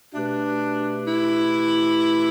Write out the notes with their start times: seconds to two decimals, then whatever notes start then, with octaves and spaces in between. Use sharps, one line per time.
0.14 B2 A3 D4 G4 B4
1.06 E4